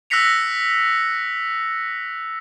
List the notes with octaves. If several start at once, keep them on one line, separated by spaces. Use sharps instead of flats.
E6 F#6 A#6 B6 C#7 F7